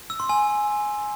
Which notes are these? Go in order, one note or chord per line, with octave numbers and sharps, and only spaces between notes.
E6
C6
G#5